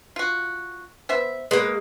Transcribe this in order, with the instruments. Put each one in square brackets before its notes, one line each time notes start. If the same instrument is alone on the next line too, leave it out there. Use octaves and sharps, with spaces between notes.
[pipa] F4 F#4
B3 C5 E5
[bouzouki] G#3 A#3 [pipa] B3 B4